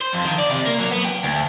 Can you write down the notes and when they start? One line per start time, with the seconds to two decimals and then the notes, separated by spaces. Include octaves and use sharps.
0.01 C5
0.13 F2
0.25 D#3
0.39 D5
0.51 C3
0.66 A#3
0.80 F#3
0.91 B3
1.05 G5
1.23 D2